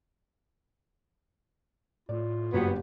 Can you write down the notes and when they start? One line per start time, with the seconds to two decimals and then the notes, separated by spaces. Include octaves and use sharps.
2.09 A2 F4 D5
2.53 F#1 G2 F#3 B3 G4